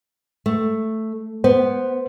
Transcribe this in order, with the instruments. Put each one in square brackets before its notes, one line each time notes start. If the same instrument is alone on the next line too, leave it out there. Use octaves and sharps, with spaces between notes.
[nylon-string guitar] A3
[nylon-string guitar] B3 [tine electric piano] C5